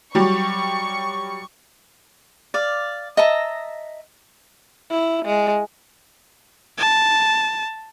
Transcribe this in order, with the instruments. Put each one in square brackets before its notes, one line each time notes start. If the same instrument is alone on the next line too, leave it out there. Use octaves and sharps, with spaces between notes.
[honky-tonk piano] F#3 G3 [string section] C#6
[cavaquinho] D5 F5
D#5 E5 A5 A#5
[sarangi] E4
G#3
[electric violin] A5